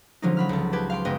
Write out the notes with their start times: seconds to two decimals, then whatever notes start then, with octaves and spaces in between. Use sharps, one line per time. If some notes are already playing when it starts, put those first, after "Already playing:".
0.22 D3 F3 F#3 G#3 C#4 D#4
0.37 F#3 B5 F6
0.49 C#2 A4
0.73 G4 B4 A5 G#6
0.90 F5 G5 C6
1.05 F#1 G#3 B3 D#5 G5